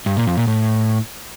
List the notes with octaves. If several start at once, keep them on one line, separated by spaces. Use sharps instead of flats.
G2
A#2
F2
A#2
A2